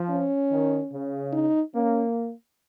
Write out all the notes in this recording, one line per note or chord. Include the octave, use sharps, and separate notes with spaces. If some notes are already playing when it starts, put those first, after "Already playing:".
Already playing: F3
C#4
D#3
C#3
D#4
A#3 C#4